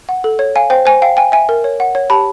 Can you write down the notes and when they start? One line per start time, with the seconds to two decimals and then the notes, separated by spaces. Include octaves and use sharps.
0.09 F#5
0.24 A4
0.39 C#5
0.56 F5 G#5
0.70 C5 G5
0.85 C5 G#5
1.02 F5 G5
1.17 G5 G#5
1.32 E5 G#5
1.49 A#4
1.64 C#5
1.80 F#5
1.95 C#5
2.10 G4 A5 B5